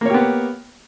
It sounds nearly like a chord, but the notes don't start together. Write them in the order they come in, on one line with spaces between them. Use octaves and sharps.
A#3 C#5 G4 B3